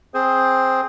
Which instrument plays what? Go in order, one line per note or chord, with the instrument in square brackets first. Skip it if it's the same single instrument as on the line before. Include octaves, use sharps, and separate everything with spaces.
[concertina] C4 G#4 C5